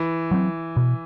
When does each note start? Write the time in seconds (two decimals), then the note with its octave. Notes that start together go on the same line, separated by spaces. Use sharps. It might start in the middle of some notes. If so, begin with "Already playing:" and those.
Already playing: E3
0.31 F#3 C4
0.77 B2